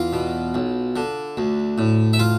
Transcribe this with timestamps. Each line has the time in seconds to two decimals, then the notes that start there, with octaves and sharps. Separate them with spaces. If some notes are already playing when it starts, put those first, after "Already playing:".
Already playing: E2 F4 F5
0.13 B2
0.54 B1
0.96 D3
1.37 D2
1.78 A2
2.13 E5
2.19 F4 F5